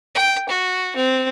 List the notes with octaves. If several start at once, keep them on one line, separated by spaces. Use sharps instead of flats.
G5
F#4
C4